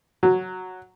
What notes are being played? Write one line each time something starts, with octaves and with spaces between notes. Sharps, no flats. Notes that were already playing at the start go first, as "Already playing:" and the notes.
F#3